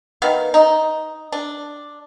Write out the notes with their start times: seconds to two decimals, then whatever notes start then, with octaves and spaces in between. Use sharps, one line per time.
0.22 D#3 B3 F5
0.54 D#4
1.32 D4